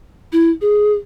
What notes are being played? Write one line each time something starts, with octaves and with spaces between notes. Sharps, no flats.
E4
G#4